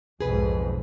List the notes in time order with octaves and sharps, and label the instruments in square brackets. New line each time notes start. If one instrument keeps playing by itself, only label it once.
[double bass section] B1 F2 G#2 [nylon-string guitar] G#4 B4